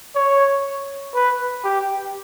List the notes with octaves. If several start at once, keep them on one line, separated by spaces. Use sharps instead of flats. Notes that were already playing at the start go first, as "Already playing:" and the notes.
C#5
B4
G4